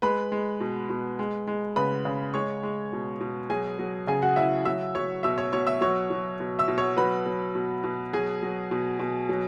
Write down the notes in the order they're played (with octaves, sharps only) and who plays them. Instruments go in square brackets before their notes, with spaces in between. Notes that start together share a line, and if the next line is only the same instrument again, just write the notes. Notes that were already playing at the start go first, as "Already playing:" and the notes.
[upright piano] G#3 B4 B5
G#3
B2
B2
G#3
G#3
C#3 B4 B5
C#3
G#3 C#5 C#6
G#3
B2
B2
F#3 G#4 G#5
F#3
C#3 G#4 G#5
F#4 F#5
C#3 E4 E5
F#3 E5 E6
F#3 C#5 C#6
B2 E5 E6
C#5 C#6
B2 C#5 C#6
E5 E6
F#3 C#5 C#6
F#3
B2
E5 E6
B2
C#5 C#6
F#3 B4 B5
F#3
B2
B2
F#3 G#4 G#5
F#3
B2
B2
F#3